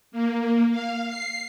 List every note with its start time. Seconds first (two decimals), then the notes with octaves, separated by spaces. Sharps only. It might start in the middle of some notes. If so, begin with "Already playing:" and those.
0.12 A#3
0.71 F5
1.08 C7